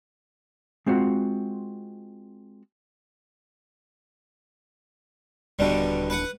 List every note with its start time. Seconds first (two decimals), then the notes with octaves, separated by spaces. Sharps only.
0.86 G#3 C4 F4 F#4 F#5
5.59 D#1 B2 D3 G3 D4
6.10 B4 F#5